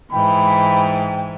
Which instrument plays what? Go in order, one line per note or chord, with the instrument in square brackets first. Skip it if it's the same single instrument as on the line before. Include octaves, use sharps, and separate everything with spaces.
[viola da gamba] G#2 E3 [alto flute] G5 [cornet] B5